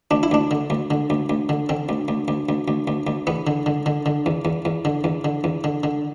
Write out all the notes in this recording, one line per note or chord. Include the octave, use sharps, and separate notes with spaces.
D2 D4
E4
D2 D4
D3
D2
D3
D2
D2
D3
D3 C4
D2
D2
D2
D2
D2
D2
D2
E2 B3
D3
D3
D3
D3
E2
E2
E2
D3
E2
D3
E2
D3
D3